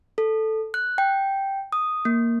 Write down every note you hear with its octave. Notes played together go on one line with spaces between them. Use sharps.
A4
F#6
G5
D#6
A#3